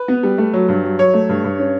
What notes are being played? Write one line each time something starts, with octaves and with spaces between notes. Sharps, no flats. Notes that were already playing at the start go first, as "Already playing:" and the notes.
Already playing: B4
B3
G3
A3
F#3
G2
F#3
F#3 C#5
A3
G2
G2
C#4